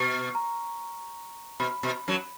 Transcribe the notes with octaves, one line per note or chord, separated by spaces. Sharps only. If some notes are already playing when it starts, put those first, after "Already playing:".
Already playing: B2 C#6
A#5
B2 B5
B2
F#2 F#3